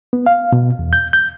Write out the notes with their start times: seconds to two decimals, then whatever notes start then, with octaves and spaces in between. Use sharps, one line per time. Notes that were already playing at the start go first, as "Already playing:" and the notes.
0.13 B3
0.26 F5
0.53 B2
0.79 E2
0.93 G6
1.13 G6